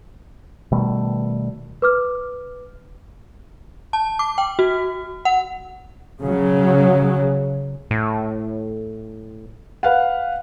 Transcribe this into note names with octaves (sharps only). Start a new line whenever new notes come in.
B2 D#3 G3 A3
B4 D6 F6
A5
D6
G5
F#4
F#5
C#3 F#3
A2
B4 F5 F#5